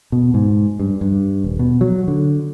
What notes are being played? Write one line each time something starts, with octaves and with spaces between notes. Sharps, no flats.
B2
G#2
G2
G2
D#1
B2
F#3
D3